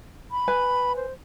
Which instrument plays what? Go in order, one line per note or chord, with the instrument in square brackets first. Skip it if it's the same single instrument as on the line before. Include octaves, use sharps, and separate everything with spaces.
[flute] B5
[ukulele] B4 G#5
[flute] C5